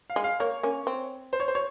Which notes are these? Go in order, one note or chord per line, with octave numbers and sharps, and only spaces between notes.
F5
G#3
F5
A#3 C#5
A#3 C#4
C4
C5
C#5
C5
C#5